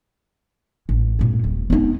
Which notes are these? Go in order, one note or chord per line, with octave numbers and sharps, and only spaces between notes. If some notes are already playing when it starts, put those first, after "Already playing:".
A1
G2 A#2
D#1
B3 D#4